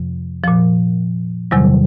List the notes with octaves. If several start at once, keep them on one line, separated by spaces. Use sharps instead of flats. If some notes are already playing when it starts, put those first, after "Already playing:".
Already playing: F2 C3 F3
A#2 F3
E2 C3 D#3 F#3 G3